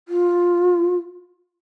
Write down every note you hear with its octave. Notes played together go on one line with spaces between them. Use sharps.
F4